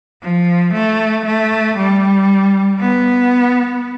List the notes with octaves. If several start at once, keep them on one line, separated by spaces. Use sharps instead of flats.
F3
A3
A3
G3
B3